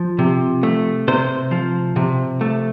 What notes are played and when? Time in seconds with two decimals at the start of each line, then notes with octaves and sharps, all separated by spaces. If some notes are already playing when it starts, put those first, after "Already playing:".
Already playing: F3
0.19 C3
0.63 A3
1.08 C3 C5
1.51 F3
1.96 C3
2.41 A3